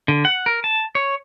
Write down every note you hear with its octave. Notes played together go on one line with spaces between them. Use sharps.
D3
F#5
A#4
A5
C#5